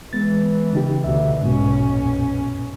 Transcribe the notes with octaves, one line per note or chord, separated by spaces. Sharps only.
E3 G#3 B3 A6
C#3 D#4 G4
D2 B2 E5
B1 G#2 B2 C#4
F#2 A#2